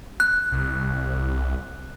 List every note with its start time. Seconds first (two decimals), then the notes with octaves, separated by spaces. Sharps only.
0.20 F#6
0.52 C2